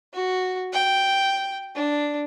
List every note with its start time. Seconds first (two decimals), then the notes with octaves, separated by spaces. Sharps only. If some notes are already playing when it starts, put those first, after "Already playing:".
0.14 F#4
0.73 G5
1.75 D4